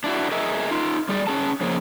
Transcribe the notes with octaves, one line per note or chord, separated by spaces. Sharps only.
D4 E4 F#4
G#4 A#4 D#5 E5
D#4 F4
G3 G#4 D5
C#4 G#4 A5
C#3 F3 A#3 G#4